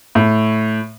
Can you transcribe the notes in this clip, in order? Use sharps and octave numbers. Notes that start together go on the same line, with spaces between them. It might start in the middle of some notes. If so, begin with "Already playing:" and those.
A2